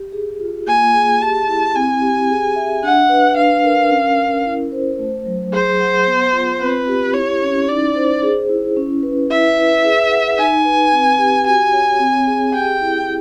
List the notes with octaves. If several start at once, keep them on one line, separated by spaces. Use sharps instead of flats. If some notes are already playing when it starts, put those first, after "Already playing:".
Already playing: G4
G#4
F4
A#3 G#5
G#4
G4 A5
E4
C4 G#5
G4
G#4
E5
D4 F#5
B4
D4 F5
A#4
C#4
A#4
E4
C5
A3
F#3
G#4 C5
F#5
B3
F4
C4 B4
G4
E4 C#5
C#4
D#4 D5
C5
G#4
E4
C#4
B4
E4 E5
B4
G#4
F#5
D#4 G#5
B4
C4
G4
F#4 G#5
C#5
C4
G#4
G4 G5
E4